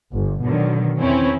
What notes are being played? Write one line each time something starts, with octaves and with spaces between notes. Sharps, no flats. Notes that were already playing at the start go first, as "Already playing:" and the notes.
G1
B2 D3 D#3 F#3
E2 D#3 E3 C4 C#4 E4